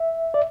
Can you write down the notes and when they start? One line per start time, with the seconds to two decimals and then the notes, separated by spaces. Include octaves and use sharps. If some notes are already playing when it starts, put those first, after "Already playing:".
Already playing: E5
0.34 D5